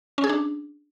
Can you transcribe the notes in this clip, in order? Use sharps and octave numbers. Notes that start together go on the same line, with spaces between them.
C#4
G#4
D4